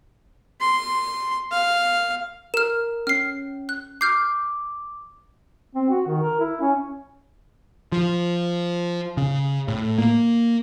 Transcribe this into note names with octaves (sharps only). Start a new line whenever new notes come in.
C6
F5
A#4 F6 E7
C#4 F6 C7
F#6
D6 F6 G6 C7
C4
F#4
D#3
A#4
E4
C#4
F3
C#3
A2
A#3